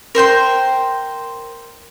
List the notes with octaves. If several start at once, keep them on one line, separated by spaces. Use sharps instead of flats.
A#4 C5 G5 C6